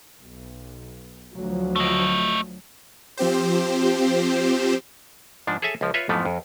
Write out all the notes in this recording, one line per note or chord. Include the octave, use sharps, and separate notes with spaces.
B1
D2 F3 F#3
A3 D#5
F3 C4 G4 C5
G#2 F3 D4
G#4 A4 C#5 E5 G#5 A5
C#2 F3
F4 B4 C#5 E5
F2 G#2 E3 F3 A3 B3
F2